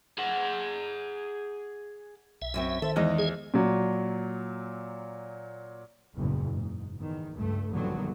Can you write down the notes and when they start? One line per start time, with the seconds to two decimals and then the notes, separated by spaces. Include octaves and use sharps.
0.18 G#4 F#5
2.42 B1 E5
2.54 F#2 F#3 C4
2.82 D#3 A4 C5
2.96 E2 G#3 D#4 D#5
3.19 G#4
3.54 A#2 F#3
6.15 F#1 E2 G2 A#2
6.52 G#2
6.96 E2 D#3
7.34 C#2 G2 A3
7.71 A#1 G2 D3 D#3 F#3 B3